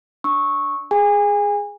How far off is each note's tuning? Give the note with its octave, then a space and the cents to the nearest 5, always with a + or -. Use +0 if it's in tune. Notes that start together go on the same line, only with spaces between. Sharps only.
D4 +0 C#6 -10 E6 -25
G#4 +0 G#5 -30